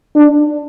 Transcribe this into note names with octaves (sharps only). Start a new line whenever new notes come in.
D4